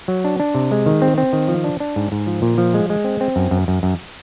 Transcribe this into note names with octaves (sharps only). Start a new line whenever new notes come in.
F#3
D4
D4
C3
G#3
D#3
C4
C4
D#3
F3
D4
D4
G#2
G#2
F3
A#2
F3
G#3
G#3
C4
C4
F#2
F#2
F#2
F#2